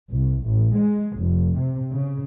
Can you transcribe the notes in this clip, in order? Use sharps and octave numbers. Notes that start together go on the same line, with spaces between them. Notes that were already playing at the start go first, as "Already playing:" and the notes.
C2
A1
G#3
F1
C3
C#3